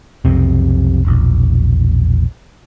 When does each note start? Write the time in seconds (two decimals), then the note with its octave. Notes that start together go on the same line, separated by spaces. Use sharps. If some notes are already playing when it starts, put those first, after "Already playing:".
0.25 B1 F2 C3
1.05 E1 A#1